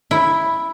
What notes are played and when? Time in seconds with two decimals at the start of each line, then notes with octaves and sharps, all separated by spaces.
0.11 E4